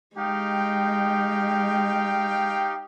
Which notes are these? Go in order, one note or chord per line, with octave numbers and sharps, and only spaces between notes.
G#3 D#4 G4 F5 G5